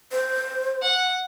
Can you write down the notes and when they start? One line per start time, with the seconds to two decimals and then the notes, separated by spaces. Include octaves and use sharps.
0.12 C5
0.82 F#5